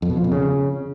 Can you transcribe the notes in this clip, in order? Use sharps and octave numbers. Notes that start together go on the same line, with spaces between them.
F2
B2
F3
F2
C#3